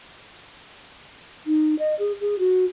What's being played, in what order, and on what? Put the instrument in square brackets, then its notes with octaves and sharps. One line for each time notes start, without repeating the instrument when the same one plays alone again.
[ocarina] D#4
D#5
G#4
G#4
F#4